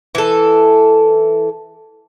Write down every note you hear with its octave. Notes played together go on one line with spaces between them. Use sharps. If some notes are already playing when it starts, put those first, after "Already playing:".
E3 A4